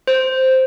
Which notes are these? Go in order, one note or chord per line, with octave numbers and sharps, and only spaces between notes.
C5